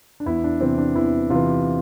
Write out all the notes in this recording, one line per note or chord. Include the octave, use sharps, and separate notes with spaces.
D4
E2 E4
D4
C3 E3 C4
D4
E2 E4
C3 E3 F4